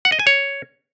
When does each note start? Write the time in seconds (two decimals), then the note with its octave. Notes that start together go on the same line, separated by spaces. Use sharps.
0.05 F#5
0.12 D#5
0.19 G#5
0.27 C#5